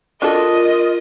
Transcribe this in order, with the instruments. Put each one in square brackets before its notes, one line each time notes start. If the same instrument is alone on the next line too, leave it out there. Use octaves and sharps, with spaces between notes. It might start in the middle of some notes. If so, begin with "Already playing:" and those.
[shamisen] D4 F#4 A4 [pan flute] F4 [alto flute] A#4 [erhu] D#5